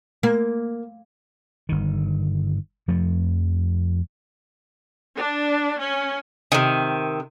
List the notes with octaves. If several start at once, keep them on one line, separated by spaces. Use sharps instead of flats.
A#3
G1 D#3
F2 F3 A3
D4
C#4
C3 D#3